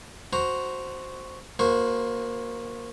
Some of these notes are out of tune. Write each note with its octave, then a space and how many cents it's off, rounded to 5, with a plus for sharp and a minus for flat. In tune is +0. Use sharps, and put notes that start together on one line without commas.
F#4 +0 C5 +0 A#5 +0
A#3 +10 F#4 -15 C5 +0